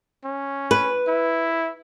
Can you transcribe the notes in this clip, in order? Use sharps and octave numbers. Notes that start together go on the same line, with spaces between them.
C#4
B4
E4